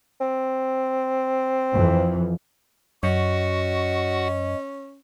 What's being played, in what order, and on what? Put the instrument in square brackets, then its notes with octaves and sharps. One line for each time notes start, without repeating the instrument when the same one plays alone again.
[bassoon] C4
[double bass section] F2 E3
[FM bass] F#2 [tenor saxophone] C#4 [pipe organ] F#4 F#5 [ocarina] D#5